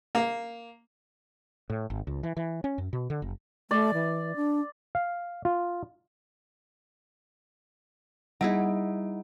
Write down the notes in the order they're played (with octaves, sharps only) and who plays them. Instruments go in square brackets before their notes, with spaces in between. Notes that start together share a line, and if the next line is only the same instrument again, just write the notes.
[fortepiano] A#3
[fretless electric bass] A2
G#1
C#2
E3
E3
C#4
F#2
B2
D3
F#1
[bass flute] A3 [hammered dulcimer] D5
[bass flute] E3
D4
[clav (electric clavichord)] F5
F4
[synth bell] G3 F#5 [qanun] D#4 E4 G#4